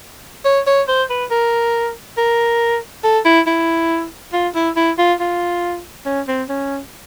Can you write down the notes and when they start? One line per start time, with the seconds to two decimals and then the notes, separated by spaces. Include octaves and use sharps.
0.45 C#5
0.67 C#5
0.88 C5
1.10 B4
1.31 A#4
2.17 A#4
3.04 A4
3.25 E4
3.47 E4
4.33 F4
4.55 E4
4.76 E4
4.98 F4
5.20 F4
6.06 C#4
6.28 C4
6.49 C#4